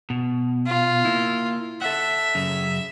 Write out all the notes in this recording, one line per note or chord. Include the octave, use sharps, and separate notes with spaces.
B2
F4
A#3 E4
A4 E5 F#5
F#2 C#3